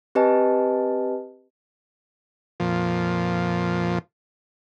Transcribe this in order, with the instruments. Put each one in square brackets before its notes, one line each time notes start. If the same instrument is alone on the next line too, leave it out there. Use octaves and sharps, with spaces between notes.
[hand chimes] C4 G4 B4 D#5 G#5 A5
[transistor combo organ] F2 A#2 F3